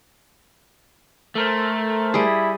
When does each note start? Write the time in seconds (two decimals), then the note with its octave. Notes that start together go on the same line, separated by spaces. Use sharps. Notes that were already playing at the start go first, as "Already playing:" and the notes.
1.35 A3 A4 A#4 C5
2.14 G3 E4 G#4